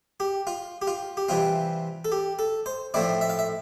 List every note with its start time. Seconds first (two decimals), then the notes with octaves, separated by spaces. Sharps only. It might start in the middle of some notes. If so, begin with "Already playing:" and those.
0.20 G4
0.47 F4
0.82 G4
0.87 F4
1.17 G4
1.29 C3 E3 G3 C4 F4
2.05 A4
2.12 G4
2.39 A4
2.66 C5
2.94 A2 F3 A3 C4 E4 D5
3.21 E5
3.30 F5
3.39 E5